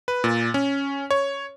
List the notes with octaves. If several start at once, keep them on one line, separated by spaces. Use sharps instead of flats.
B4
A#2
C#4
C#5